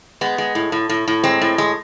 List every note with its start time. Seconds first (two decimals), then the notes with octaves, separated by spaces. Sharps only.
0.21 G#3 B3
0.38 G#3
0.55 A2
0.72 A2
0.89 A2
1.08 A2
1.24 G#3 C4
1.41 A2
1.58 G#3